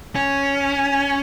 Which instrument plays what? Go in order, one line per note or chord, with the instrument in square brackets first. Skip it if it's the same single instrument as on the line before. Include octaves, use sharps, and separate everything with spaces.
[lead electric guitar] C#4